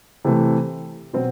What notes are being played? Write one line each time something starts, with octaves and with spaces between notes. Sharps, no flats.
C3 E3 A3
B2 F#3 C4